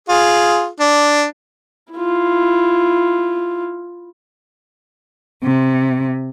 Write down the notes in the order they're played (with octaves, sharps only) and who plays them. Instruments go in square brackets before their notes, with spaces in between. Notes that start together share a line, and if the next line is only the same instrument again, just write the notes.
[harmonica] F4 G#4
D4
[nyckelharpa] E4 F4
[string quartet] C3